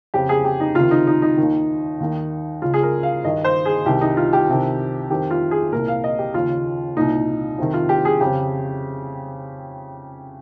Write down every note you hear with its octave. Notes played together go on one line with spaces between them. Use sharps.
F2 C#3 G4
G#4
G4
D#4
C#2 C3 D#3 F4
D#4
D#4
D#4
D#2 D#3
D#2 D#3
C#2 C#3 F4
G#4
A#4
F5
G2 D#3 D#5
C5
G#4
C2 C3 D#3 G4
D#4
F4
G4
C2 C3 D#3
F2 D#3 G4
F4
G#4
C2 A#2 A#4
F5
D#5
G4
D#2 C#3 F4
C2 A#2 D#4
F2 C3 D#3
F4
G4
G#4
F2 C#3 G4